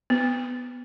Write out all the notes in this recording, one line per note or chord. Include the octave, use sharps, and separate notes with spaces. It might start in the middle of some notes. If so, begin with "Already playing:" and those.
B3